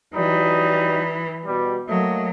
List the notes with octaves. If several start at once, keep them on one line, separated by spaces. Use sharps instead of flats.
E3 F#3 G3 D#4
B2 G3
F#3 A3 A#3 D#5